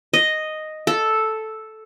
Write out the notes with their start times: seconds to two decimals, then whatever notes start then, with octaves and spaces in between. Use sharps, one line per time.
0.13 D#5
0.87 A4